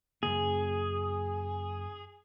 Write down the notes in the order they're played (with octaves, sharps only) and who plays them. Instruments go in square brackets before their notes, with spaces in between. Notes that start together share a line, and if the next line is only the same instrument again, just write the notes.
[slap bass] F#2 C#3 A#3 [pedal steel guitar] G#4